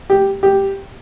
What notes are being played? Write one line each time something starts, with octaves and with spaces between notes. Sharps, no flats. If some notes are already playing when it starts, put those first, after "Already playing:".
G4
G4